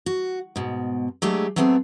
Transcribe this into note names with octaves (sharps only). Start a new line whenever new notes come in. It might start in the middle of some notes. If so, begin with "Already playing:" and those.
F#4
G#2 B2
F#3 G#3 A3 D4 G4 G#4
F#3 A3 B3 C4 F4 G#4